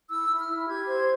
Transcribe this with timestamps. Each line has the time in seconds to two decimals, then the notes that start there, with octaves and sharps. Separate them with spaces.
0.11 E4 E6
0.30 E4
0.39 F6
0.49 E4
0.68 G4 G#6
0.88 C5